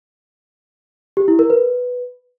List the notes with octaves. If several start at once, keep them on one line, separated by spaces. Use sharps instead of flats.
G4
E4
A#4
B4